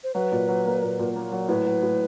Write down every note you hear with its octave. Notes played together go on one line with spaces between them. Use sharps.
C5
F#3 B4
A#2
F#3
A#3
A#2
A#2
A#3
F#3
A2 B4
F#3
A2